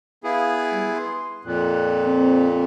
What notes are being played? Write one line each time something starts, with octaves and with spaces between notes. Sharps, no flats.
B3 E4 G#4 F5
G3
C6
F2 A#2 F#6
C4